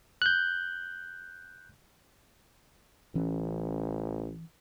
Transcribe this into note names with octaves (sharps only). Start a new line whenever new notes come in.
F#6 G6
A1 E3 C#4